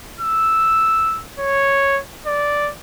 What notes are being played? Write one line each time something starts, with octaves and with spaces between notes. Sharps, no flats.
E6
C#5
D5